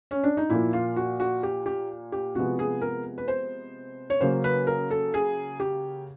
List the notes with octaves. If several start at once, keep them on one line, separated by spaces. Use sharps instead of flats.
C#4
D4
D#4
A#2 F3 A#3 E4
F4
F#4
F#4
G4
G4
G4
C3 F3 G#3 B3 F#4
G#4
A#4
B4
C5
C#5
C#3 F#3 A#3 C5
B4
A#4
A4
G#4
G4